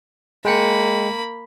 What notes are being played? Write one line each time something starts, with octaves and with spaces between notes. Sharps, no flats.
G#3 A#3 G5 B5 C#7